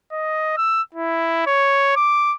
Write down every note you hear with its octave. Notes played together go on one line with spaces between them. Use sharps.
D#5
E6
E4
C#5
D6